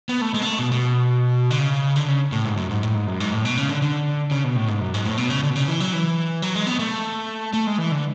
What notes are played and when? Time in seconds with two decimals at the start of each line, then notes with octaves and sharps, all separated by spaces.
0.09 B3
0.21 A3
0.34 G#3
0.42 B3
0.47 A3
0.59 B2
0.72 B2
1.50 D3
1.58 C#3
1.96 D3
2.08 C#3
2.32 A2
2.45 G#2
2.57 F#2
2.70 G#2
2.83 A2
2.95 G#2
3.07 F#2
3.20 G#2
3.32 A2
3.45 B2
3.57 C#3
3.69 D3
3.82 D3
4.31 C#3
4.44 B2
4.56 A2
4.68 G#2
4.80 F#2
4.94 G#2
5.06 A2
5.17 B2
5.30 C#3
5.43 D3
5.50 B2
5.55 C#3
5.68 E3
5.80 F#3
5.93 E3
6.42 F#3
6.55 G#3
6.67 B3
6.79 A3
7.53 A3
7.67 G#3
7.78 E3
7.91 D3